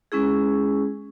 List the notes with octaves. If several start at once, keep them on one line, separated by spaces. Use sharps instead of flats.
G#3 C#4 E4 G#4